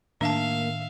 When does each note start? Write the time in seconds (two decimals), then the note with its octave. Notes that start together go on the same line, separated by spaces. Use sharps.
0.21 A2 D#3 A#3 D4 E5 F5 A5